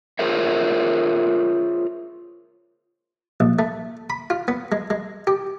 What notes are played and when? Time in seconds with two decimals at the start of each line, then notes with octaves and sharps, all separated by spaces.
0.19 F4 G#4 A#4 C5 C#5 E5
3.40 A#1
3.59 A3
4.10 B5
4.30 F4
4.48 B3
4.72 G#3
4.90 G#3
5.27 G4